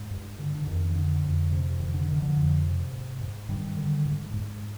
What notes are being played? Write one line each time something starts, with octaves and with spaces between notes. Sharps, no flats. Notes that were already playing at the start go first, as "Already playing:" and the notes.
Already playing: G#2
G2
D3
D3
F2 D#3
D3
F2
C3
F2 D#3
D3
D3 D#3
D3 F3
F2
C3
G#2
G#2
G2 D#3 G3
D3
G#2
G#2